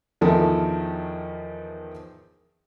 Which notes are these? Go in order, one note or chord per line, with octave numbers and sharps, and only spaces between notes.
E2 D#3 F3 E4 A4 A#4